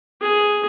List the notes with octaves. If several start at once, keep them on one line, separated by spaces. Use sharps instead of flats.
G#4